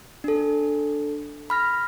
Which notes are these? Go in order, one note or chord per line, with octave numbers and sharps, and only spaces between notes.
D4 A4
B5 F6 A#6